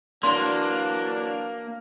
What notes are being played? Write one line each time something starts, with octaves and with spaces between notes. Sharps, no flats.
E3 F#3 A#3 D4 C6